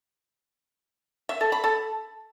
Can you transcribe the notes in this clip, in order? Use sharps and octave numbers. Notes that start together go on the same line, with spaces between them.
E5
A4
B5
A4